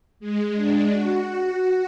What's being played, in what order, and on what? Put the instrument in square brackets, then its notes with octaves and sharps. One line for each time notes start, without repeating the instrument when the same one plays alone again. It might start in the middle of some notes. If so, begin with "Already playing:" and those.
[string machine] G#3
D4
F#4